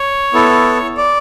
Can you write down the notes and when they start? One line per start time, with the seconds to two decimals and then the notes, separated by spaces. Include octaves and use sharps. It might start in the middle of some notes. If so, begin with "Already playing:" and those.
Already playing: C#5
0.33 B3 E4 A4
0.97 D5